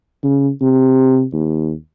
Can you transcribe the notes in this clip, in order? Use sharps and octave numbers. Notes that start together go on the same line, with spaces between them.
C#3
C3
D#2